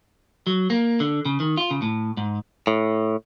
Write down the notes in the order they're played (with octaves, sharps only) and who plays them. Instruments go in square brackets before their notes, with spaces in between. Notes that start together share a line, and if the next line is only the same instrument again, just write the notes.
[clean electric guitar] F#3
A#3
D3
C#3
D#3
F4
C#3
A2
G#2
A2